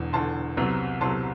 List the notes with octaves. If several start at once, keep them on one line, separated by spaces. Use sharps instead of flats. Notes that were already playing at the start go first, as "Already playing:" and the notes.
Already playing: E1 E2 D3
E1 E2 D3 A5 C6
C2 C3 F#3 B3
C2 C3 F#3 B3 A5 C6